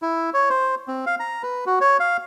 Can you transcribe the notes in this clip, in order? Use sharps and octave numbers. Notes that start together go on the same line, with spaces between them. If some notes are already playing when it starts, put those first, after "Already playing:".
E4
C#5
C5
C4
F5
A#5
B4
F#4
C#5
F5